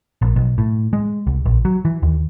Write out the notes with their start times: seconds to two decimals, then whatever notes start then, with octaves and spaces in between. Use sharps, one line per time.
0.22 A#1
0.36 B1
0.58 A2
0.93 G#3
1.27 C2
1.46 A#1
1.65 F#3
1.85 E3
2.03 D#2